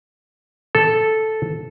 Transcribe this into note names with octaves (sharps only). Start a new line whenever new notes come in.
A4